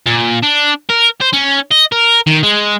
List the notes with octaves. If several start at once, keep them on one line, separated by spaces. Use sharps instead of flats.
A#2
D4
A#4
C5
C#4
D#5
A#4
D#3
G#3